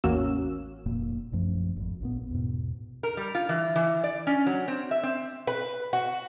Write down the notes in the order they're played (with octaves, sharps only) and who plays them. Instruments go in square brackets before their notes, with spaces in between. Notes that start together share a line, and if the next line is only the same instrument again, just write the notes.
[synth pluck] A1 E2 A#3 C#4 F#4 E6
[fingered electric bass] F1 A#2 A#3
A#1 F#2 F3 A3
G#1 F2
A#1 A#2 B3
E2 G#2 B2
[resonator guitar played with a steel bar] A#4
G3
F4
E3
E3
D5
C#4
F#3
C4
E5
C4
[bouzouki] B4
F#4